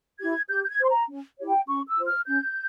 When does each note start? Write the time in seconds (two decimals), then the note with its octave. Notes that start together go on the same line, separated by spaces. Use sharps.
0.20 E4 G4 G#6
0.50 G4 G6
0.64 G6
0.69 G#6
0.79 C5 C6
0.89 A#5
1.08 C#4
1.39 E4 G4 C#5
1.48 G5
1.68 C#4 C#6
1.87 E6
1.97 F4 C5
2.07 F6
2.26 C#4 G6